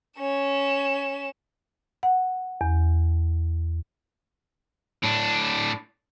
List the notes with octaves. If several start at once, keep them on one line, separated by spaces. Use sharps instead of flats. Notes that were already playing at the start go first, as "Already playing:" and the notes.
C#4 E7
F#5
E2
A2 D4